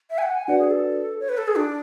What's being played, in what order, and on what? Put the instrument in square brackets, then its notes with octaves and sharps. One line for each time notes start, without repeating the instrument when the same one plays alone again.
[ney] E5
G#5
F#5
G#5
[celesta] D4 F#4 B4 D5 [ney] F#5
[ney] G#4
A4
C#5
B4
A4
G#4
D4